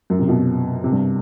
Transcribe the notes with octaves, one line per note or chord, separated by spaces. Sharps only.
F#2
C3
B2
C3
G2